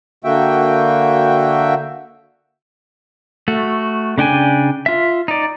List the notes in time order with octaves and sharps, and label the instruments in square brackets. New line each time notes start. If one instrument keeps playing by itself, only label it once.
[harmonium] D3 A#3 F#4 E5 G5
[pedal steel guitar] A3 F#4
C#3 D4 G5 G#5
F4 E5
D#4 D5